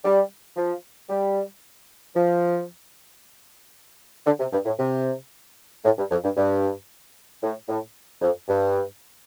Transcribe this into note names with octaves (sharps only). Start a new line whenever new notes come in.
G3
F3
G3
F3
D3
C3
G2
A2
C3
A2
G2
F2
G2
G2
A2
A2
F2
G2